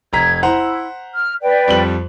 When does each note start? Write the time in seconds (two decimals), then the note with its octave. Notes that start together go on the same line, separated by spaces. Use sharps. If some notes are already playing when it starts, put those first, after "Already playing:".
0.13 F1 A#5 G#6 B6
0.43 E4 C5 F#5 A#5
1.14 F6
1.42 B4 D5 G5
1.68 F2 G3 F#7